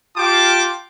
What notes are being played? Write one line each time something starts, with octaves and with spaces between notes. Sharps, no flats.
F4 G4 F5 G5 A5 D6